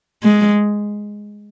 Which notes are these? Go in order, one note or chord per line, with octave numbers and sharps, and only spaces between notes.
G#3